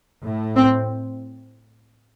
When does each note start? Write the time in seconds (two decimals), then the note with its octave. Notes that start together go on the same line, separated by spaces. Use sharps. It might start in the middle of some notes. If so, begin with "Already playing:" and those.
0.22 A2
0.56 C4